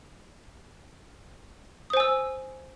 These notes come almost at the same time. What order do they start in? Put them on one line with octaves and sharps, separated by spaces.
D#6 C5 G#5 E6